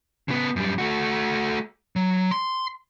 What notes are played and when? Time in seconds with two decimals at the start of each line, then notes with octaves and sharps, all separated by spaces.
0.28 C#3 B3
0.56 F#2 G3
0.78 A3 F#4
1.96 F#3
2.31 C6